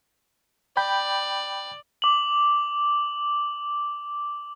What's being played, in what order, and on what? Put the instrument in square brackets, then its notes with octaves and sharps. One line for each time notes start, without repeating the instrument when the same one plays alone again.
[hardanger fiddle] D5 [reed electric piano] G5 B5 G6
[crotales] D6 F#7